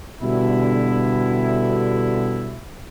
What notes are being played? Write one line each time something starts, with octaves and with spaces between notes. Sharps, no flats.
B2 D3 G3 E4